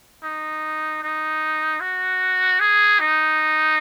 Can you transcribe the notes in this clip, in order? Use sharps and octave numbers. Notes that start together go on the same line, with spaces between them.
D#4
D#4
F#4
G#4
D#4